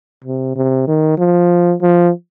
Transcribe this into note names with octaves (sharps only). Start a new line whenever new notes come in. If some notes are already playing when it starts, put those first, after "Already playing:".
C3
C3
D#3
F3
F3